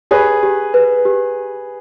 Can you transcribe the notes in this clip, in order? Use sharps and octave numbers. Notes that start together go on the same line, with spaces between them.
G4 G#4 B4
G4
B4
G4